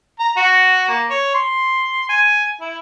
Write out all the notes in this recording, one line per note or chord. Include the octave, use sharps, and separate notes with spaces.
A#5
F#4
A#3
C#5
C6
G#5
E4